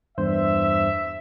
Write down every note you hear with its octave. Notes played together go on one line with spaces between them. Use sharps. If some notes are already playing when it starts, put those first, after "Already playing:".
E2 G2 C5 E5